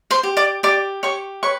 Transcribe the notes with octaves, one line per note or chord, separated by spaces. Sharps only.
C5 C6
G4
D5 D6
G4 D5 D6
G4 C#5 C#6
B4 C#5 C#6